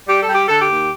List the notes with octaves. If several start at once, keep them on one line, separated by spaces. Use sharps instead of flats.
G3 G4
A4
G3
G4
D3 A4
G4
D#2